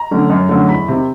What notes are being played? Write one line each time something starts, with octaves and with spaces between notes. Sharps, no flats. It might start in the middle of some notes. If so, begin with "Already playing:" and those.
Already playing: A#5
D3 F#3 A3 C#4
F#2
D3 F#3 A3 C#4
E2 B5
C3 D#3